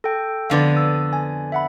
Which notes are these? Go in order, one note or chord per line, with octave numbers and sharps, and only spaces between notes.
A4 G5
F2 D3 B3 D5 F5
E6
G#5
E5 F#5 B5